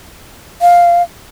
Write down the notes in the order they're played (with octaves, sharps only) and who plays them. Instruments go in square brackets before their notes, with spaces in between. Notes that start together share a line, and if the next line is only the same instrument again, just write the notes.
[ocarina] F5